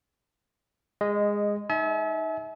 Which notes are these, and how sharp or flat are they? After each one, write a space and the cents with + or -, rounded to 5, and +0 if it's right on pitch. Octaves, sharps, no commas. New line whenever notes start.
G#3 -15 D#5 +0
D#4 +0 E5 -30 G#5 +45